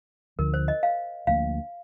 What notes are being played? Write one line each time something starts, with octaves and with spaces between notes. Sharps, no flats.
D2 D3 F3 A#4
C5
D#5
F5
D2 D3 F3 A#3 F5